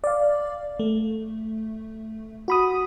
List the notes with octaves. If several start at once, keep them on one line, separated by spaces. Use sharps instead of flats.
D5 F5
A3
F#4 B5 D#6